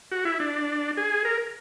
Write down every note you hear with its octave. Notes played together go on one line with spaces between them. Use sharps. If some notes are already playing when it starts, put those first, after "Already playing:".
F#4
E4
D4
G#4
A#4